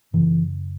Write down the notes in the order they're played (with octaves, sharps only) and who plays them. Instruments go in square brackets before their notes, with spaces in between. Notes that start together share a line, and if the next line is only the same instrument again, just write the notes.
[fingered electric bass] F#2 C#3 E3